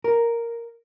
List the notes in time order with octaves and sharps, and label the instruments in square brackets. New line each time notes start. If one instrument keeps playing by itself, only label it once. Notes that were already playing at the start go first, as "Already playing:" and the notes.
[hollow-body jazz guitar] A#4